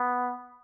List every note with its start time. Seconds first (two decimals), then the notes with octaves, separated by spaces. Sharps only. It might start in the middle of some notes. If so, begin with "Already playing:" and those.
Already playing: B3